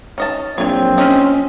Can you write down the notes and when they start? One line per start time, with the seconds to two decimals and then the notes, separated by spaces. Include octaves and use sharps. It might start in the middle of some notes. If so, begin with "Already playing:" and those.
0.18 C#4 D#5 A5
0.58 A#1 F#3 C4 C#5 G#5
0.98 C#4 C#5 D#5